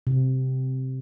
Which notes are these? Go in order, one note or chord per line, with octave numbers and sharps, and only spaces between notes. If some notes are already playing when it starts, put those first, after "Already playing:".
C3